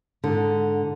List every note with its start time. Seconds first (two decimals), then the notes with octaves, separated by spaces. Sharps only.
0.24 G#2 D3